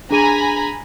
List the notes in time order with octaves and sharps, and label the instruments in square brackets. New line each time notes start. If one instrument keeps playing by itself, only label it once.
[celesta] D4 G#4 D#7 [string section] G#5 A#5 B5